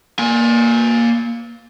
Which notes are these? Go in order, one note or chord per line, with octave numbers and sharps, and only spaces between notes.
A#3 G#5